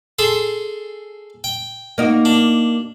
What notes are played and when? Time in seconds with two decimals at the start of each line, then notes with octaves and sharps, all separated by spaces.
0.19 G#4 A4 C6
1.44 G5
1.98 A#3 D#4 F#4
2.25 D4